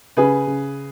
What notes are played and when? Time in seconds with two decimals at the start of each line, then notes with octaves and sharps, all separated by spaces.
0.17 C#3 G#4 B4
0.47 C#3